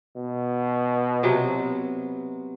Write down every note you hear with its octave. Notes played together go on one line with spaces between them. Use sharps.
B2
C3 F#3 B3